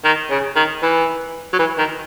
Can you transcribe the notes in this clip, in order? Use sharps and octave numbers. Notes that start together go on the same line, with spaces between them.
D#3
C#3
D#3
E3
F#3
E3
D#3